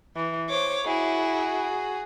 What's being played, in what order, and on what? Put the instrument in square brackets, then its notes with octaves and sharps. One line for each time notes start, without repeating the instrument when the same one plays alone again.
[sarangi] E3
[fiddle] C5 D6 [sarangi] C#5
[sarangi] E4 [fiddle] F#4 G#4